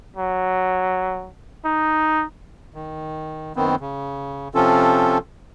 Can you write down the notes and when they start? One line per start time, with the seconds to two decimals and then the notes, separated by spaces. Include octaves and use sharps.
0.17 F#3
1.65 D#4
2.74 D#3
3.56 F#2 D#3 B3 C4
3.81 C#3
4.55 C3 F3 C4 C#4 F4 A4